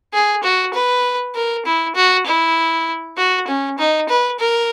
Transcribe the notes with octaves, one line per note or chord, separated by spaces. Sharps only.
G#4
F#4
B4
A#4
E4
F#4
E4
F#4
C#4
D#4
B4
A#4